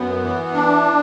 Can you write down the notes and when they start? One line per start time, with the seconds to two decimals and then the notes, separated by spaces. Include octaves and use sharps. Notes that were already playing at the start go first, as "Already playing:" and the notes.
Already playing: F#2 B3
0.24 E3
0.54 D4